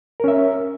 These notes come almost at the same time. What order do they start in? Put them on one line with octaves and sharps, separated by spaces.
A#4 C#4 E5